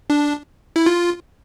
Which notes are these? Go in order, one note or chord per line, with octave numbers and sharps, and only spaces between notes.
D4
E4
F4